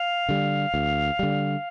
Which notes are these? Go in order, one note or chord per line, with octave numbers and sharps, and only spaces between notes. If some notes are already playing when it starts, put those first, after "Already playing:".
Already playing: F5
D3 G3
D2
D3 G3